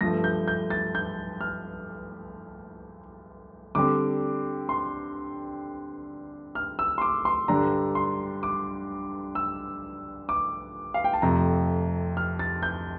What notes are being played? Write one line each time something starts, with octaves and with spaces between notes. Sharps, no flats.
G2 F3 A3 A#6
G6
G6
A6
G6
F6
D3 G3 C4 D6
C6
F6
E6
C6
D6
C6
G2 D3 G3 D4 A#5
C6
D6
E6
D6
F5
G5
A5
F2 C3 F3 A3 A#5
F6
A6
G6